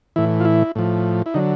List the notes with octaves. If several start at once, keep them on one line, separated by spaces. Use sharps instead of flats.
A2 E3 E4
F4
E4
A2 F3
E4
D3 F#3 D#4